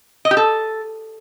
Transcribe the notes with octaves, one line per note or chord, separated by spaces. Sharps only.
D#5
G4
A4